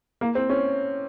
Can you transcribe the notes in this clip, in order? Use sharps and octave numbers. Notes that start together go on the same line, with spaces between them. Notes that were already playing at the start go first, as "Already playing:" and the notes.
A#3
C4
C#4